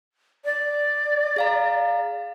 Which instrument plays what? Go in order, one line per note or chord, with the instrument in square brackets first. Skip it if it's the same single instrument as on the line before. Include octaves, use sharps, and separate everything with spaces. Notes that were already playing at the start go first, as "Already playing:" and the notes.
[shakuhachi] D5
[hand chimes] G#4 F5 A#5